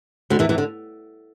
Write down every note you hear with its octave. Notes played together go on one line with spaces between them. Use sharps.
D2 D3
E2 E3
E2 E3
D3